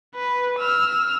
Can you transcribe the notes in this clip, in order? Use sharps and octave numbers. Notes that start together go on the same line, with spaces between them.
B4
E6 F6